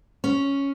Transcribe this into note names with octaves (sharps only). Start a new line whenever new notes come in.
C#4